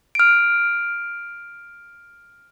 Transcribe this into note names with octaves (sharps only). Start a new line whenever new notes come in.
F6 D7